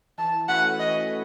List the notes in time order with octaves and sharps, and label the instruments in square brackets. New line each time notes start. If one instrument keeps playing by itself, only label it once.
[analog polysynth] E3 [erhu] A5
[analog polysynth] A3 C#4 F#4 B4 [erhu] F#5
[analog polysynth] E3 [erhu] D#5